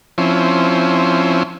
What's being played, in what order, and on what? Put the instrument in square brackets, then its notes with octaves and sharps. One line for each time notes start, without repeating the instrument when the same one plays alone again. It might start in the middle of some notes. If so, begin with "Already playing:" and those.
[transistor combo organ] F3 C4 C#4 E4